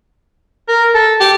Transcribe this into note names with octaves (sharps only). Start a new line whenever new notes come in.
A#4
A4
G4